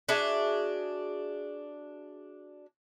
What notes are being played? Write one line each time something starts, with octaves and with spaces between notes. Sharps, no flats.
D4 F#4 G#4 E5